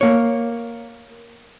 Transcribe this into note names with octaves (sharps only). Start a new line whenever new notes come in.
A#3 C#5